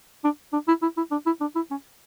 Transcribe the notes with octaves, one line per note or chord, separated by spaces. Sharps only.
D4
D4
E4
E4
E4
D4
E4
D4
E4
C#4